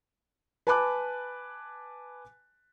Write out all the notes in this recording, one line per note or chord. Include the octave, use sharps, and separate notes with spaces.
B4 G#5 A5 B5 D6 F#6